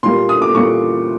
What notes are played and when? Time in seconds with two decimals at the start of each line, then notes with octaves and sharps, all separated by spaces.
0.03 A#2 G3 A#3 C6
0.29 D#6
0.42 D6
0.55 A#2 G3 A#3 C#6